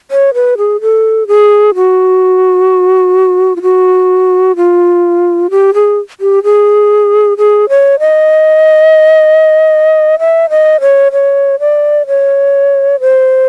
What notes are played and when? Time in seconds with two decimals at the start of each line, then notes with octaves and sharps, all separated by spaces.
0.11 C#5
0.34 B4
0.58 G#4
0.81 A4
1.28 G#4
1.75 F#4
3.56 F4
3.62 F#4
4.56 F4
5.51 G4
5.74 G#4
6.21 G4
6.44 G#4
7.38 G#4
7.69 C#5
8.00 D#5
10.19 E5
10.50 D#5
10.81 C#5
11.13 C#5
11.60 D5
12.07 C#5
13.00 C5